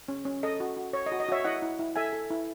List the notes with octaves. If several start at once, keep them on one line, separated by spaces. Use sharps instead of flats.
C#4
C#4
A4 D#5
F#4
F#4
C#5
D#5
F#4
D#5
F#4 C#5 E5
E4 D#5 F#5
E4
E4
A4 E5 G#5
A4
E4